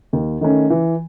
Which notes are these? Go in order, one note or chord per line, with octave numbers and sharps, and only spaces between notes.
D#2
D#3 A3 C#4
E3